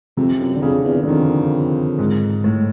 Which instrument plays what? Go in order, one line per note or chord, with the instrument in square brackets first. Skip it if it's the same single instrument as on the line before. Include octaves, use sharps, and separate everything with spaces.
[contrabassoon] F2 [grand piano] C3
[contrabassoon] F#2
[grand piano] D3
[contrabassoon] F2 [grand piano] C#3
[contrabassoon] E2
[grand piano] D3
[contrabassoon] F2 [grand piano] D#3
[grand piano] G#2
A2